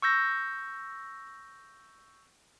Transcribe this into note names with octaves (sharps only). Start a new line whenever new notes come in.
C#6 E6 G6 A#6